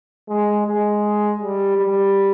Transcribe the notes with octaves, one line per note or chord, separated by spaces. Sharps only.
G#3
G#3
G3
G3